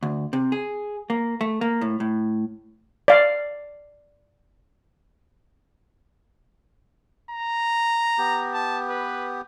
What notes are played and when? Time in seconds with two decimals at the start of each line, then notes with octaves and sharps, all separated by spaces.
0.03 D2
0.33 C3
0.52 G#4
1.10 A#3
1.41 A3
1.61 A#3
1.81 A2
2.00 A2
3.08 D5 F5
7.31 A#5
8.18 B3 G4
8.54 A5
8.89 B4